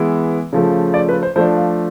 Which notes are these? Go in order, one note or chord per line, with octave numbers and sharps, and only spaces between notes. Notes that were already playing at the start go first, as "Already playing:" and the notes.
Already playing: E3 G#3 B3 E4
C#3 F3 A3
D5
B4
C5
F3 A3 D4 C5
F5